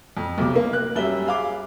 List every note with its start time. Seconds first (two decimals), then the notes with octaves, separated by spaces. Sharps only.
0.17 F2
0.38 B1 C3 D6
0.56 A#3
0.73 F#6
0.95 F#2 G3 E5 G7
1.26 G#4 F5 D6